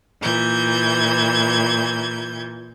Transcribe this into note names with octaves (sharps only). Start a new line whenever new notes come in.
A#2 E3 G6 G#6